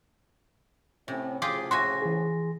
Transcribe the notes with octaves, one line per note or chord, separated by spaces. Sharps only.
A2 C3 C4 C#4
A2 C#3 F3 F4 G4 G#4 D6
F#4 E5 G#5 C6 A#6
E3 G#4